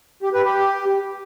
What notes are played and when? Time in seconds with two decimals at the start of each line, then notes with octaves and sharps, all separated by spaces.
0.22 G4
0.33 B4
0.45 G4